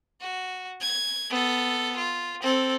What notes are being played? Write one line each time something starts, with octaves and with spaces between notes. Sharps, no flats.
F#4
G#6
B3 A4
F4
C4 A4